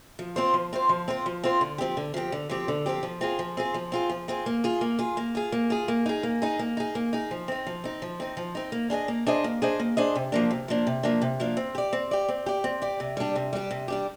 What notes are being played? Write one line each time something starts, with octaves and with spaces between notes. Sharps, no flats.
F3
C4 F4 C5
F3
C4 F4 C5
F3
C4 F4 C5
F3
C4 F4 C5
D3
F3 C4 G4
D3
F3 C4 G4
D3
F3 C4 G4
D3
F3 C4 G4
F3
C4 F4 G#4
F3
C4 F4 G#4
F3
C4 F4 G#4
F3
C4 F4 G#4
A#3
F4 G#4
A#3
F4 G#4
A#3
F4 G#4
A#3
F4 G#4
A#3
D#4 G#4
A#3
D#4 G#4
A#3
D#4 G#4
A#3
D#4 G#4
F3
C4 D#4
F3
C4 D#4
F3
C4 D#4
F3
C4 D#4
A#3
D4 G#4 C5 D#5
A#3
D4 G#4 C5 D#5
A#3
D4 G#4 C5 D#5
A#3
D4 G#4 C5 D#5
C3
F3 A#3 D4
C3
F3 A#3 D4
C3
F3 A#3 D4
C3
F3 A#3 D4
C4
G4 D5
C4
G4 D5
C4
G4 D5
C4
G4 D5
C3
G3 D4 G4
C3
G3 D4 G4
C3
G3 D4 G4